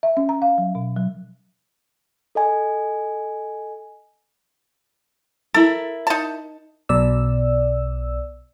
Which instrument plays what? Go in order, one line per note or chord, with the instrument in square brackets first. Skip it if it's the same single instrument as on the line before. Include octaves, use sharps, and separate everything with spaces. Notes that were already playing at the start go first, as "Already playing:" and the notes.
[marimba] E5
C#4
A#5
F5
F#3
B2
F#3
[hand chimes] A4 D#5 G#5
[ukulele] E4 A#4 [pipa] A4
[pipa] D#4 A5
[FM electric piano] B1 B2 D5 E6